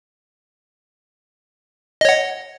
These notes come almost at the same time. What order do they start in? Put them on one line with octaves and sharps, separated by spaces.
D#5 C#5 F#5